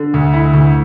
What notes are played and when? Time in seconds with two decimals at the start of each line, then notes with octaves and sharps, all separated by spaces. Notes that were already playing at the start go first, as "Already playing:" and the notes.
Already playing: D3
0.14 D2
0.34 E4
0.54 D2